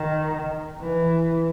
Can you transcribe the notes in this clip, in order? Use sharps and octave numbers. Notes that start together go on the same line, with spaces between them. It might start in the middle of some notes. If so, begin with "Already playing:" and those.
Already playing: D#3
E3